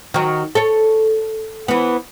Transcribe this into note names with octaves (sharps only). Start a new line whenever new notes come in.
D#3 F#3
A4 C#5
E3 B3